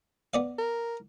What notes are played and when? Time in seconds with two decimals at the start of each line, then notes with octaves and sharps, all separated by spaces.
0.34 B3 D5 F5
0.58 A#4